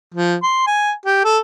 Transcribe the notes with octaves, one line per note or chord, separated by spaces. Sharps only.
F3
C6
G#5
G4
A4